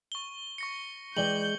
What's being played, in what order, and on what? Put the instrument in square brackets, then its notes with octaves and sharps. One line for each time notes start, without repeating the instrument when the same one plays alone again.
[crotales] C#6 G7
C#6 A#6 C#7
[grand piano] E3 D5 G5 [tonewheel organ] G#3 [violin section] G6 [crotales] F#7